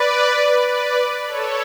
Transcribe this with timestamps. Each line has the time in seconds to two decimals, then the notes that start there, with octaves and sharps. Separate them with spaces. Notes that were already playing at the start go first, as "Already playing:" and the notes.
Already playing: B4 D5
0.61 B4 D5
1.27 A4 C#5